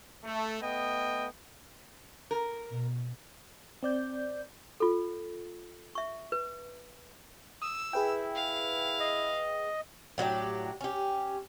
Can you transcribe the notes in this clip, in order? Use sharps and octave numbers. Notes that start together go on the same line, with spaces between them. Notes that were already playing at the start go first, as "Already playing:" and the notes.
A3
A3 B3 D#5 G5
A#4
B2
C4 D5 G6
F4 A4
E5 C#6
B4
D#6 E6
E4 G#4 B4 G5
F5
D#5
A2 F#3 D4 G4
C#4 G4